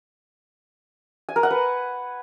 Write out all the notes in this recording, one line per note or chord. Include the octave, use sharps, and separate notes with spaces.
G#5
A#4
F#5
B4